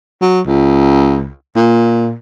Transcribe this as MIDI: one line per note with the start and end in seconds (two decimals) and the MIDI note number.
0.21 0.41 54
0.46 1.29 37
1.56 2.13 46